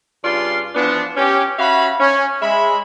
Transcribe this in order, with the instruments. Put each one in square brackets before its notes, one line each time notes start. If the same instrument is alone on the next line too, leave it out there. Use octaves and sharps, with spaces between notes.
[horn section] G2 C#3 F4 D5 F5 C6
E3 F3 B3 D4
C#4 G4
C#4 F#4 E5 F5 B5
C#4
G#3 E5 B5